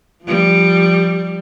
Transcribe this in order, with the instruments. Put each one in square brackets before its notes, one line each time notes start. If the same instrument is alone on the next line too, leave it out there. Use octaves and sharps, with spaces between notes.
[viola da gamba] F3 G3